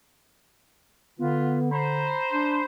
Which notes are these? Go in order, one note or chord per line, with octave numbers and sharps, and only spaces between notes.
D3 B3 F4 B4
C5 A#5 B5
D4